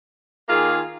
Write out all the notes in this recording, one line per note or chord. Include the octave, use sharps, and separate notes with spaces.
D#3 A#3 F4 G#4